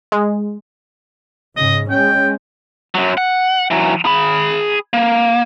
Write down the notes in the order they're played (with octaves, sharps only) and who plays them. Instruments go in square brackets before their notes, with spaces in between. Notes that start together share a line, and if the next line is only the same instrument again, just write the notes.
[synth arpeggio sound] G#3
[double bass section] G#2 C#3 [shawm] D#5
[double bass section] G#3 C#4 [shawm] G5
[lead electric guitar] F#2 F#3
F#5
E3 F#3
G#4 B5
A#3